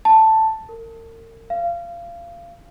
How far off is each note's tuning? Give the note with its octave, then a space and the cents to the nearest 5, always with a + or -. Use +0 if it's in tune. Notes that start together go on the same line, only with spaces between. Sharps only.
A5 +5
A#4 -40
F5 -25